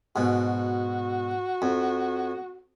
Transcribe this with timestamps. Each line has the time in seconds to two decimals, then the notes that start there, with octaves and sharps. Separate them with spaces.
0.16 G#2 B2 F#4
1.62 F2